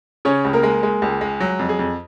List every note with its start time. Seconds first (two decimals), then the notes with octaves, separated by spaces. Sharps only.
0.25 C#3 C#4 C#5
0.45 C#2
0.53 A#3 A#4
0.63 G#3
0.83 G#3
1.02 C#2
1.21 G#3
1.40 F#3
1.59 F2
1.69 G#4
1.79 F2